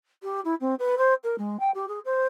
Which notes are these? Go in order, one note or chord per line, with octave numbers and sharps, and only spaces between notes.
G4
E4
C4
B4
C5
A#4
G#3
G5
G4
G#4
C5